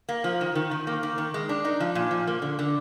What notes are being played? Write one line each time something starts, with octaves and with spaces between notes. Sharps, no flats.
A#3
F3
D#3
D#3
D#3
A#3
D#3
D#3
G#3
D4
D#4
F3
A#2
F3
A#3
D3
D3